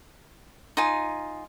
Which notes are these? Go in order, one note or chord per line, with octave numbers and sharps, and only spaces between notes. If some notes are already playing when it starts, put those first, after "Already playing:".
D#4 F4 G#5